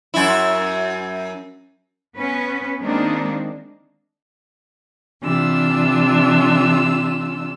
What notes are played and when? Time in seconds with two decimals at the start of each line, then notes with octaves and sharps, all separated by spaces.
0.14 F#2 E4
2.17 B3 C#4 B4
2.80 D#3 G#3 A#3 C4 D4 D#4
5.21 C3 E3 D4 F4 E6